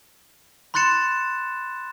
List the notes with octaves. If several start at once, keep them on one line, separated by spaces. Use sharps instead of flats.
B5 C6 F#6 A6 C#7 E7